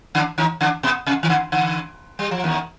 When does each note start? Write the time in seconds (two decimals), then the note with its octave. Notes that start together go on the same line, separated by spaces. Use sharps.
0.15 D3 D4
0.38 D#3 D#4
0.61 D3 D4
0.83 B2 B3
1.07 C3
1.23 D#3
1.29 D3
1.52 D3
2.19 G3
2.31 F3
2.44 D#2 D#3